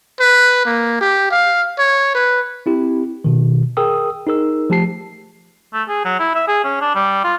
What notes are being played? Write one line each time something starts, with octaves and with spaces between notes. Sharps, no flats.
B4
A#3
G4
F5
C#5
B4
C4 E4 G4
B2 D#3
G#4 A#4 G5 D#6 E6
D#4 G#4 A#4 E6
F3 A3 G4 A5 C7
A3
G#4
F#3
E4
E5
G#4
C#4
D4
G3
F4